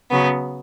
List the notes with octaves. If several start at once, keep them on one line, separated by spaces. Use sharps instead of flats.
C#3 F#3 B3